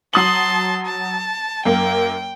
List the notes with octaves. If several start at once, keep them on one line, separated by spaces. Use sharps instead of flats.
F#3 A5 C6 D#6 F#7
A5
F#2 A#3 G5